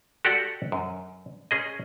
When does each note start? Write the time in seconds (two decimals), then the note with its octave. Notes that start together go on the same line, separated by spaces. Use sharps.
0.25 F#4 G4 A4 D5 F#5
0.72 F#2
1.51 C#4 G#4 D#5